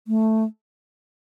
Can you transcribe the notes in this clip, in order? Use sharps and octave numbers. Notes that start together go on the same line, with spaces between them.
A3